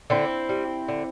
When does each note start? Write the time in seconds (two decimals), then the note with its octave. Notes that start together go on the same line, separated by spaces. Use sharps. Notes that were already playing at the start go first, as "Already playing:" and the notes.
0.10 D3 C4 E4
0.49 G3
0.88 D3